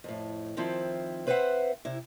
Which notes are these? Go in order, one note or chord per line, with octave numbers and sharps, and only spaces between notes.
F2 A2
D#3 F3 C4 E4
C4 B4 C5 D5 E5 F#5
C3 E4